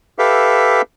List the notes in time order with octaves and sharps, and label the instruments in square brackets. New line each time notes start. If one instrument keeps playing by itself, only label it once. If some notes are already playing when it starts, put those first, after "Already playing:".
[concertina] G4 A4 B4 E5 F5